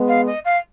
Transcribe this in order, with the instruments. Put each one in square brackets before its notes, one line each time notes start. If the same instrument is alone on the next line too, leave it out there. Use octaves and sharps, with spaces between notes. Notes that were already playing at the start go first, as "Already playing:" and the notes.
Already playing: [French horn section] G#3 B3
[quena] F5
D#5
F5